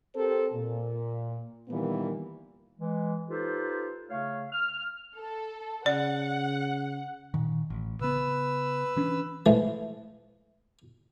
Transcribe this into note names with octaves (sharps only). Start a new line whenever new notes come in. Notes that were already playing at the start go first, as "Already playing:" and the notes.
C4 G4 A4 A#4 C5
A#2
A#2 D#3 E3 G3 A#3 B3
E3 G#3
D#4 F4 G4 A4 B4 C5
C#3 A3 C#5 F5
F6
A4
C#3 D5 F#5
A#2 D#3
A1
C#3 B3 B4 E6
E3 C#4 D4
E3 F3 G#3 A3